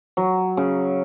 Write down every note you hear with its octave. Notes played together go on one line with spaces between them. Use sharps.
F#3
C#3